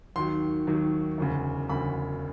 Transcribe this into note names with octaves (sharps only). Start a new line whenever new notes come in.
D#2 D#3 F#3 C6
D#2 D#3 F#3
E1 D2 C#3
E1 D2 C#3 B5